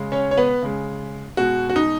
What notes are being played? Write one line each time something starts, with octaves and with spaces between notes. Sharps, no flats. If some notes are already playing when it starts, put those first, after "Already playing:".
Already playing: C#3 G#3
C#4 C#5
C#5
B3 B4
C#3 G#3
B2 G#3 F#4
F#4
D#4